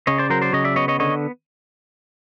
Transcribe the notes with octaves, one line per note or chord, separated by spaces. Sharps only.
C#3 C#5 D#5
C5 D5
F#3 A#4 C5
C5 D5
C#3 C#5 D#5
D5 E5
B3 C#5 D#5
C#5 D#5
D3 C#5 D#5